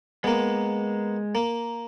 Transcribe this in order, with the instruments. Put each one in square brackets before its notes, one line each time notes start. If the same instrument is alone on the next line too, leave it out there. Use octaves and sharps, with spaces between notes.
[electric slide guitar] G#3 [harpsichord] A#3 B3
[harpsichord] A#3